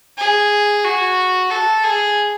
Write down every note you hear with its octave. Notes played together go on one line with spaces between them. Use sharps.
G#4
F#4
A4
G#4